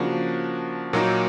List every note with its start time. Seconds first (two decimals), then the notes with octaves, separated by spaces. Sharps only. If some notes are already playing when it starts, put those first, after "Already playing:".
Already playing: C#3 F3 A#3 D4 F#4
0.93 A#2 F#3 A#3 D#4